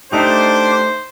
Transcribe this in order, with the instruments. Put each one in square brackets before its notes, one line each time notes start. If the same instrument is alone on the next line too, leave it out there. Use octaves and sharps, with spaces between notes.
[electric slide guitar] A3 D#4 G4 [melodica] D4 D6 [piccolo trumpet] C5